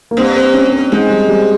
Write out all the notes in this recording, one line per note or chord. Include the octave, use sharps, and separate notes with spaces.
A#3
G2 C4
C4
C#4
C4
G#2 G#3
G3
G3